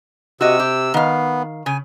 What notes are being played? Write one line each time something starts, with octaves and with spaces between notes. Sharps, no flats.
C3 F#4 D#5 E6
G4
D#3 B3 F5
C#3 G#5